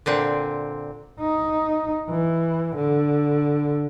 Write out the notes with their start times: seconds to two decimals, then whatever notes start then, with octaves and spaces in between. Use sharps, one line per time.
0.06 A#2 D3 C4
1.20 D#4
2.10 E3
2.76 D3